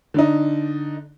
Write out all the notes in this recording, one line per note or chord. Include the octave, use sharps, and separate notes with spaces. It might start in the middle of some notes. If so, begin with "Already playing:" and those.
D3 D4 D#4